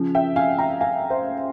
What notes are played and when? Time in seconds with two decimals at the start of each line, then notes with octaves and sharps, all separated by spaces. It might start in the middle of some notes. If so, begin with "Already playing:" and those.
Already playing: C#3 F3
0.15 E5 G5
0.36 F5 G#5
0.58 G5 A#5
0.81 F5 G#5
1.10 C5 E5